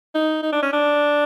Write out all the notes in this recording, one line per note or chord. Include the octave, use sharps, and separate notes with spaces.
D#4
D#4
D4
C#4
D4